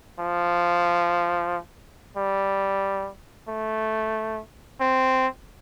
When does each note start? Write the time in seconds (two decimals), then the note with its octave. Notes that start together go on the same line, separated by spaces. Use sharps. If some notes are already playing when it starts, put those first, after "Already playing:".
0.20 F3
2.17 G3
3.49 A3
4.81 C4